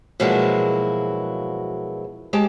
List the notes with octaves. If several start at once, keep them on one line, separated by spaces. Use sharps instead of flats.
B2 F3 F#3 G#3 A#3 E4
G#3 G4 A5